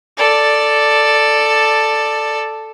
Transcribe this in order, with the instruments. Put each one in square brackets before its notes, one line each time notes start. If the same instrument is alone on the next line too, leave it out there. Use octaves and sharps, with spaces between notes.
[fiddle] A4 D5